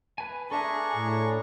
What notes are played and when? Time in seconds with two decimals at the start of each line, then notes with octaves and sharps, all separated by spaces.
0.18 B4 G#5
0.51 D4 G#4 A4 E5 A#5 C#6
0.95 A2